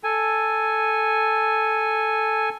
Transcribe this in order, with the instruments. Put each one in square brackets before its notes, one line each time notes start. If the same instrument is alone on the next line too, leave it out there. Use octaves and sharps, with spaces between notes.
[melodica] A4 G#5